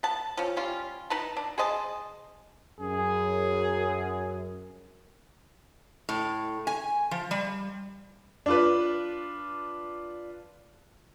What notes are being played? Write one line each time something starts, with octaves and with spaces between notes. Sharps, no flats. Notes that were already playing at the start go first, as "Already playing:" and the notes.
B3 A5
F3 C#4
G3 C#4 F4
D#4 B4 A5
D4
G#4 C5 D#5 A5
F#2 G#4
A2
G#5
F3
G3
D4 F4 B4